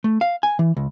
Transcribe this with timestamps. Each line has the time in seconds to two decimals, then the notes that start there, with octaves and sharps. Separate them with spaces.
0.04 A3
0.21 F5
0.43 G#5
0.59 E3
0.77 C#2